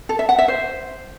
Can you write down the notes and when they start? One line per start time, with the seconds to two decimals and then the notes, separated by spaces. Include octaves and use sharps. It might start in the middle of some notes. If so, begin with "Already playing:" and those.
0.09 A4
0.19 E5
0.29 F#5
0.39 E5
0.48 C5